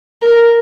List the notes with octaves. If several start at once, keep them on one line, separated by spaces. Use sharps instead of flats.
A#4